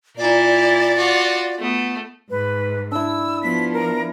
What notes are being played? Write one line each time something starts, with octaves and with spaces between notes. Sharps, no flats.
A#2 A#3 E4 D5
F4 F#4
A3 B3
G#2 B4
D4 E4 E6
F3 B3 B6
A#4